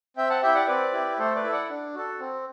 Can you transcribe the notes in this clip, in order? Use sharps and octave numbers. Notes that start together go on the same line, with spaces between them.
C4 E5 G5
F#5 A5
E4 G4 E5 G5
D5 F#5
C4 B4 D5
E4 G4
A3 A4 C5
B4 D5
E4 A4
D5 F#5
D4
F#4 A4
C4